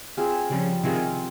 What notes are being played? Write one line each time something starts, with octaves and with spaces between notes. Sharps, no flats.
C4 F4 G#4
C#3 F3 G3
C3 D#3 C4 F4 G#4